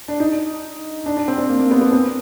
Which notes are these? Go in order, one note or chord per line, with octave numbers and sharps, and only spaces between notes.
D4
D#4
D4
D4
C4
C4
A#3
A#3
B3
B3
C4